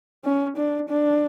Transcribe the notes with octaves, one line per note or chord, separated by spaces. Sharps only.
C#4
D4
D4